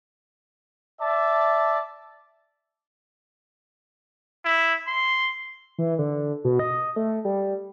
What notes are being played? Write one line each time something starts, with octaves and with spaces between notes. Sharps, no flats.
D5 E5 A5
E4
C6
E3
D3
B2
D#5
A3
G3